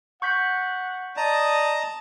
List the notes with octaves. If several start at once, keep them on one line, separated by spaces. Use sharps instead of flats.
F#5 C#6 G6 B6
D5 D#5 A5 A#5 D#6